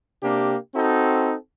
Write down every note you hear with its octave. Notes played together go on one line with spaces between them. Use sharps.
C3 A#3 D4 G4
C4 D#4 F#4 A4